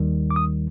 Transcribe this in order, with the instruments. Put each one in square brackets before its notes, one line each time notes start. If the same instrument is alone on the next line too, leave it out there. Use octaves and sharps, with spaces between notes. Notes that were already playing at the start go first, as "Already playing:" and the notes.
Already playing: [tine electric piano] D#2 D#3 G3
D6
D#6